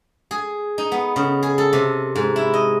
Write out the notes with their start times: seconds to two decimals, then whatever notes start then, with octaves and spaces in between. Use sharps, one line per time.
0.31 G#4
0.78 D#4
0.92 B3
1.16 C#3
1.43 G#4
1.58 A4
1.73 C3
2.16 G#2
2.36 E4
2.54 D#5